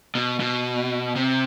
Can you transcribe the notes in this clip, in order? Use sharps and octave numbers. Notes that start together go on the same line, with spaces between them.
B2
B2
C3